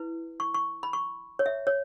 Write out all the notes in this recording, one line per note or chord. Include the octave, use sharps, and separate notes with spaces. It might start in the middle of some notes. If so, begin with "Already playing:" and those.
Already playing: E4 B4
C#6
C#6
B5
C#6
C#5
E5
C#5